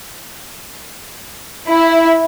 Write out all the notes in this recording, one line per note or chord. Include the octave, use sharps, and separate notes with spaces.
E4